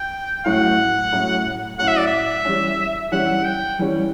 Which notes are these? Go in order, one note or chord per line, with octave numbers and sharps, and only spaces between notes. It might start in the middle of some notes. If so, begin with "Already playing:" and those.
Already playing: G5
A2 F#3 C#4 E4 F#5
A2 F#3 C#4 E4
A2 F#3 C#4 E4 F#5
E5
D5
E5
E3 G3 C#4
E3 G3 C#4 F#5
G5
E3 G3 C#4